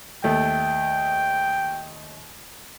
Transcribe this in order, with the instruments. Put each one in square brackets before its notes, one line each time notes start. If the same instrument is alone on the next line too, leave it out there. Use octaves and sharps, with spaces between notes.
[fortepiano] D#2 A3 [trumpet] G5